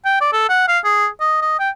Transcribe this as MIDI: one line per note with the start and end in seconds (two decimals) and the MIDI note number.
0.05 0.19 79
0.21 0.32 74
0.33 0.47 69
0.49 0.67 78
0.68 0.79 77
0.84 1.07 68
1.21 1.39 75
1.42 1.57 75
1.59 1.70 79